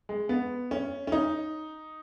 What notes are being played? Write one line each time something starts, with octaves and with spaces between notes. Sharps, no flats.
G#3
B3
C#4
C#4
D#4